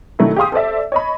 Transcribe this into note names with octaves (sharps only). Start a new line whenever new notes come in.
D#3 F#3 A3 E4
G4 G#4 F5 C6 D#6
A4 C5 D5 E5
C#5 D#5 B5